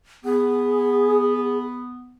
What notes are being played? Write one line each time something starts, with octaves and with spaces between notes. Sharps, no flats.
B3 G#4